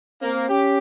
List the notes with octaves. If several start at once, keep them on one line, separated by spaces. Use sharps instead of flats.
A#3 C4
C#4 G4